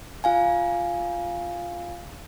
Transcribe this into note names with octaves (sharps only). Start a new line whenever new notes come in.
F4 F5 G#5